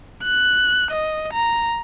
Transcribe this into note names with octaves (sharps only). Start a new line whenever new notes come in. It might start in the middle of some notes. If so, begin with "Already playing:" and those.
F#6
D#5
A#5